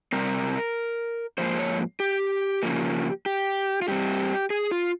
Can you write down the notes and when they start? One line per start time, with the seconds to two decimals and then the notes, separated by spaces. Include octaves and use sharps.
0.12 C3 G3 C4 A#4
1.38 G#2 F3 A#3 C5
1.59 C#5
2.00 G4
2.63 C#3 F3 A#3
3.26 G4
3.82 F4
3.88 G2 G3 C4 G4
4.50 G#4
4.71 F4